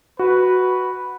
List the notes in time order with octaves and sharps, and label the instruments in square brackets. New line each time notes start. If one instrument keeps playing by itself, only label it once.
[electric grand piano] F#4 [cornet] B4